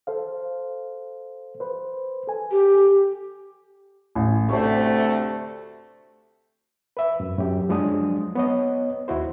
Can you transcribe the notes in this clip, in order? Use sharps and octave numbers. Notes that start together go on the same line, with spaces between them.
A4 C5 F5
B4 C5
A4 G#5
G4
A1
D2 C3 A3 C5 C#6
B4 E5
F#2
F#2 G4
F3 F#3 G#3 D4 D#6
B3 C#5 D#5
D#2 E4 F#4 C5